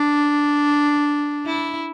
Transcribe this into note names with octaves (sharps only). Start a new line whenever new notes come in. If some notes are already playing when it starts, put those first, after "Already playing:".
Already playing: D4
E4